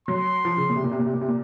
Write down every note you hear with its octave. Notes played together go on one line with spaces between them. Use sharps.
F#3 C6
F3
C#3
A#2
C3
A#2
C3
A#2
C3
A#2
C3
A#2